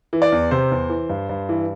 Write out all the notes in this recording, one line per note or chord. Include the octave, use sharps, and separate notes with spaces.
E3
D5
E2
C3 C5
E2
E3
G2
G2
E3